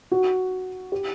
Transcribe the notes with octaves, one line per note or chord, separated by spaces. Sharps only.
F#4
G4